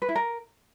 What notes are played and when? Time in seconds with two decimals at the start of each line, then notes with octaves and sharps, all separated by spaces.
0.02 B4
0.09 E4
0.15 A#4